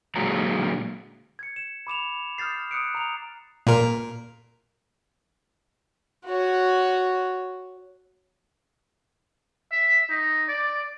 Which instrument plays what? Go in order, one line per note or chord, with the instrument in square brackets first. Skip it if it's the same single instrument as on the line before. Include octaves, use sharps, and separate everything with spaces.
[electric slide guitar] A#2 D3 F#3 G#3 A#5
[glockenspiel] G#6 C#7
E7
B5 D6 E7 F7
D#6 F6 G6 A6 C7
D#6 F#6 C#7 D7
A#5 F7
[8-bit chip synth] A#2 A#4
[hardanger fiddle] F#4 C#5
[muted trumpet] E5
D#4
D5